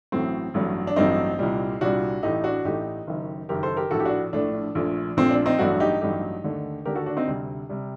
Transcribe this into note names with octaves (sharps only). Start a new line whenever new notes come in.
A1 A2 F#3 A3 C4
A1 G2 F#3 A3
D4
A1 G2 F#3 A3 C4 D#4
C2 A#2 G3
C2 A#2 G3 D4 F#4
A1 A2 A3 D#4 G4
D4 F#4
A1 A2 A3 D#4 G4
F#1 F#2 D#3
F#1 F#2 D#3 G4 A#4
A4 C5
G4 A#4
A#1 A2 A3 F#4 A4
G4
D4 F#4
A#1 A2 A3 D4
A#1 A#2 A3
A#1 A#2 A3 C4
D4
C4 D#4
A1 G2 F#3 A3 D4 F#4
D#4 G4
A1 G2 F#3 A3 D#4 G4
D#2 D3 A3
D#2 D3 A3 G4 A#4
F#4 A4
D4 F#4
C4 D#4
D2 C3 G3
C3 G3